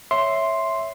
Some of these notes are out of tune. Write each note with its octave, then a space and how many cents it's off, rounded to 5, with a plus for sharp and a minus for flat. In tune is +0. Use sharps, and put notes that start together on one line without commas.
C#5 +0 E5 +0 C6 +0